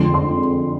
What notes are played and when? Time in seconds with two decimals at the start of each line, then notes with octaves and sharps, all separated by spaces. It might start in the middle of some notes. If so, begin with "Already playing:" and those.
Already playing: F2 D3 F3 G#3 C4 C6
0.14 C6